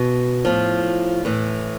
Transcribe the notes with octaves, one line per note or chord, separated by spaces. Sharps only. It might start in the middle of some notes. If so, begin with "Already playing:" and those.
Already playing: B2
A2 F3
A2 E3